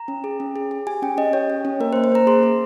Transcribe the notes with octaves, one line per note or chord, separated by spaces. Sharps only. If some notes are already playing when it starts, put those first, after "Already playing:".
Already playing: A#5
C#4
G#4
C#4
G#4
G#4
G4 G#5
C#4 G5
C#4 D#5
G4 C#5
C#4
C#4
A#3 A#4
C5
A#3
C5
A#3 A#5
G#4 C6
G#4